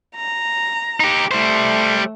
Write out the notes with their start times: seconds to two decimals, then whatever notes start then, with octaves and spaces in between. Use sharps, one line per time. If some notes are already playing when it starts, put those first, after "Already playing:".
0.16 A#5
1.00 D#4 G4
1.31 G3 A3 C5